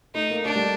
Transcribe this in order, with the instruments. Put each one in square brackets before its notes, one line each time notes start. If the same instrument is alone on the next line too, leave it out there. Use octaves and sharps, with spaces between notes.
[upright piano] A3 [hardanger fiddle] D#4
[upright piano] A#3
[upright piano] A3 [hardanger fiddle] D4
[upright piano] G3